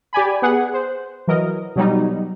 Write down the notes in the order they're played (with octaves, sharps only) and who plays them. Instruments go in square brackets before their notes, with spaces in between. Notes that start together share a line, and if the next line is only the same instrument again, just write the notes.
[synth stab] G4 D5 G#5 B5
B3 G#4 F#5
C5
E3 F#3 A#4 D#5
B2 F#3 G3 D#4